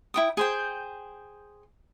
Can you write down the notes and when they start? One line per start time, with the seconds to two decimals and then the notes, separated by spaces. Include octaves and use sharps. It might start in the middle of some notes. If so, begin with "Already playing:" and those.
0.14 E4 G5 D#6
0.37 G#4 C5 G5